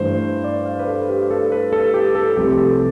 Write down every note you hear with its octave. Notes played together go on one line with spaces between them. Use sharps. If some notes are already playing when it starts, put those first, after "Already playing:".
Already playing: G2 E3 A3 C5
D5
F5
B4
A4
G4
A4
B4
A4
G4
A4
C2 C3 F3 A3 G4
G4
A4